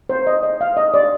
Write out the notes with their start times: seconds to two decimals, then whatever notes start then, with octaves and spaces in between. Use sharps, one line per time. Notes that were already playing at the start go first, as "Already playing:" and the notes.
0.09 C5
0.27 D#5
0.43 D#5
0.61 F5
0.77 D#5
0.94 D5